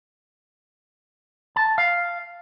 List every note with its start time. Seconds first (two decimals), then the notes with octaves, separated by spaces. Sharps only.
1.56 A5
1.78 F5